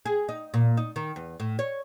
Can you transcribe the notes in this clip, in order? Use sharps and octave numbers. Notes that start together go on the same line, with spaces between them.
G#4
D#4
A#2
D#4
D#3
E2
A2
C#5